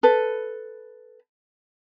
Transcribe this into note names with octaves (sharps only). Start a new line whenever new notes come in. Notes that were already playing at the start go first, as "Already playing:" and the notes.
A4 B4